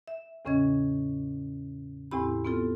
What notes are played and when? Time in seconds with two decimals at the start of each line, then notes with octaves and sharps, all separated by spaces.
0.08 E5
0.45 E2 A2 C#3 C#4 D#5 G#6
2.11 E2 A2 C4 E4 G4 B5
2.45 B3 C4 F4 A4